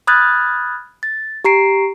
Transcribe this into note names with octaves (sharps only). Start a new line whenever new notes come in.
B5 D#6 F6 F#6 G#6 A6
A6
G4 A#5 C7 D7